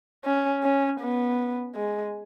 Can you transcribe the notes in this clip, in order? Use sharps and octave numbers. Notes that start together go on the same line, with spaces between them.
C#4
C#4
B3
G#3